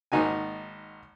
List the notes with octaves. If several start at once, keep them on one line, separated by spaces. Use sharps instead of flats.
G#1 A#3 D#4 F#4 G#5